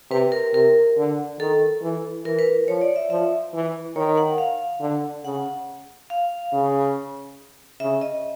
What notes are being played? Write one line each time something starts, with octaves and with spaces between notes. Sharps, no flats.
C3 B4
A#4
C3 A#4
D3
D#3 A4
E3
E3 A#4
B4
F3 C#5
D5
E5
F3 E5
E3
D#3 C#5
F#5
F5
D3
C#3 F#5
F5
C#3
C#3 E5
D#5